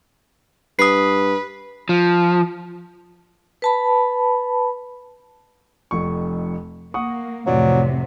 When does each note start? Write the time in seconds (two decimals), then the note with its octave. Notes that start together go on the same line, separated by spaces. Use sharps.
0.79 G2 B4 D#6 C7
1.89 F3
3.62 B4 A5 B5
5.91 F1 F2 C#6
6.94 A#3 F#5 C#6 D#6
7.46 F2 A2 C3 E3 F#3 F4 D5